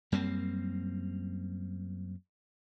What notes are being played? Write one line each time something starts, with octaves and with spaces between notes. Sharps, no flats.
F#2 G3 A#3 C4